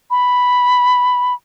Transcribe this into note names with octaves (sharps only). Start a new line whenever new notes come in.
B5